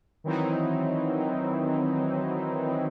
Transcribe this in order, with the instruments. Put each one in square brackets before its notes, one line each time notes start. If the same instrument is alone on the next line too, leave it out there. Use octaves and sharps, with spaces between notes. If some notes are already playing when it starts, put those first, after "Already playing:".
[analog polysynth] D#3 E3 F#3 C4 D#4 E4